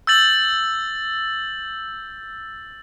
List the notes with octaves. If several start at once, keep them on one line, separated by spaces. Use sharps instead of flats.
E6 G6 A6 F#7